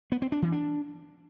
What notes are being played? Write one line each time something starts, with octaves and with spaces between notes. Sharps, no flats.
B3
C4
D4
E3
D4